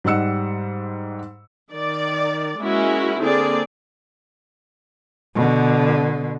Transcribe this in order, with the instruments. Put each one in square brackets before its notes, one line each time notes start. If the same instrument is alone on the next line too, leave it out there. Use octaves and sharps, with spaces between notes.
[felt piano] G#2 G3 D#5 F#5 E6 C#7
[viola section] D#3 D5
G#3 A#3 C#4 E4 F#4
D3 A#3 C4 G#4 D5
[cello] B2 D3